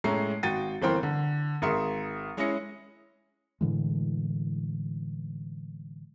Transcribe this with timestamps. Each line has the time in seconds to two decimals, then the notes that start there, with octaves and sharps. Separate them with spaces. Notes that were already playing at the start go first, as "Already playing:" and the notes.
0.04 A2 G#3 A3 C#4 A#5 C7
0.43 G#1 F#4 G5 A6 D#7
0.82 G1 E3 C4 A#4 G5 C6
1.03 D3
1.62 G#1 G#4 A#4 E5 C6 C#7
2.37 G#3 C#4 E4 G#4 A#6 C#7
3.61 A2 D3 E3 G#3